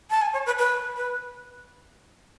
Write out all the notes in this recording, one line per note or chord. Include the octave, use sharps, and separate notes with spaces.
A5
G#5
C#5
B4
B4
B4